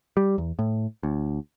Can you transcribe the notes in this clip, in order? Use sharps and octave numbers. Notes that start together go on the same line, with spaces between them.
G3
E2
A2
D2